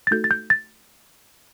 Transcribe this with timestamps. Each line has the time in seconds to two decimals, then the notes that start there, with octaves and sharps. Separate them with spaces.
0.07 A6
0.11 A3 D#4 F#4 A4 G6
0.24 A6
0.31 G6
0.50 A6